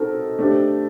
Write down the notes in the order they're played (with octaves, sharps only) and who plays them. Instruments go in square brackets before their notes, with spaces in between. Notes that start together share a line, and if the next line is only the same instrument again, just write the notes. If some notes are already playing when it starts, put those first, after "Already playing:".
Already playing: [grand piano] C4 D#4 F#4 A#4 D#5 [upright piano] A4
[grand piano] A3 D4 G4 C5